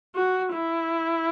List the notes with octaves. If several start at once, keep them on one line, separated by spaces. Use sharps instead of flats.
F#4
E4